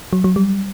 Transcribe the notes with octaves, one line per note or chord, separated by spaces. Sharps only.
F#3
F#3
G3